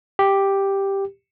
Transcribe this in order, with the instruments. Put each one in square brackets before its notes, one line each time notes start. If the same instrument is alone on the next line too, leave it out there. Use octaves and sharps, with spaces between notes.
[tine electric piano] G4